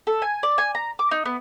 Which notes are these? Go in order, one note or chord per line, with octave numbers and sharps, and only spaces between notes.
A4
G#5
D5
G#5
A#5
D6
D#4
B3